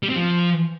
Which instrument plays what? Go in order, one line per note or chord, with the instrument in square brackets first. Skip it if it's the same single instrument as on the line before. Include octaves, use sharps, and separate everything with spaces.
[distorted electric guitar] G3
C4
F3